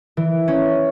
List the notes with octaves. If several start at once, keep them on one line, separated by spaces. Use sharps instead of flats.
E3
C#4